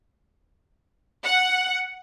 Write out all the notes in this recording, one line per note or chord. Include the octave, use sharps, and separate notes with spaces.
F#5